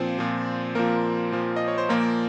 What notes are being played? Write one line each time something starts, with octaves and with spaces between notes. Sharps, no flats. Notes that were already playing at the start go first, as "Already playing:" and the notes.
Already playing: A#2 F3 C4 C5
A#2 F3
A#2 F3 A#3 A#4
A#2 F3
D#5
C#5
C5
A#2 F3 A#3 A#4